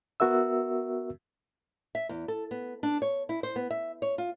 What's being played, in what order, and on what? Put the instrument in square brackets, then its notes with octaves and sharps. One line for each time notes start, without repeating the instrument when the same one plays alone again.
[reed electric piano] B3 F#4 A#4 E5 E6
[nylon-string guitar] E5
E2
A4
B3
D4
C#5
E4
C5
B3
E5
C#5
F4